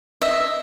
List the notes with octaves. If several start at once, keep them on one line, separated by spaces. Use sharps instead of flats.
D#5 E5